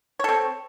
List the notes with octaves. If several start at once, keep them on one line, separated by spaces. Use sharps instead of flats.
C4 A4 C#5